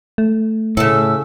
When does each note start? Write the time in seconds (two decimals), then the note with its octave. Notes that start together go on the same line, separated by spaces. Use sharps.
0.18 A3
0.77 A2 C#3 A4 E6